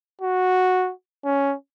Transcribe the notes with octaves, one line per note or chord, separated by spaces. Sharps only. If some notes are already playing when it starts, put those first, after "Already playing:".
F#4
C#4